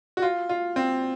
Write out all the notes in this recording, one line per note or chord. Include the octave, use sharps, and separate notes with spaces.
F#4
F4
F4
C4